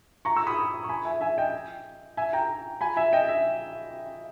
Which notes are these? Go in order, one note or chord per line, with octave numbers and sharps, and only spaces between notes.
A#5 C#6
C#6 E6
B5 D#6
C#6
G#5 B5
E5 G#5
E5 G#5
D#5 G5
E5 G#5
G5 A#5
G#5 B5
E5 G#5
D#5 G5
E5